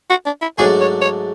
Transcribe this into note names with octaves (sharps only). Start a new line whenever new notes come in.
F#4
D4
E4
G#2 F#3 A3 D4 G#4
C#5
C#5